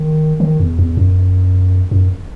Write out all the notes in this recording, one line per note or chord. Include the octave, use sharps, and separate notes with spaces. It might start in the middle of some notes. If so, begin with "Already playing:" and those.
Already playing: D#3
D#3
E2
E2
F#2
F#2